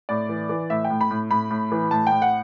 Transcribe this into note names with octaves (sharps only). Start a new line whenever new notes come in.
A2 D5
E3
E3
A2 E5
G5
A2
B5
A2
A2 B5
A2
E3
A2 A5
A2 G5
F#5